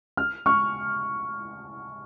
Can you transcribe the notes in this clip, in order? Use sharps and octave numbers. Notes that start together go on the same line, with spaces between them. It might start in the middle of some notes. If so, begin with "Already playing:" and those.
F6
C#6 F6